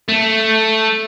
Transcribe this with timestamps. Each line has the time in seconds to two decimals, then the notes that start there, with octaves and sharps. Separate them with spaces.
0.08 A3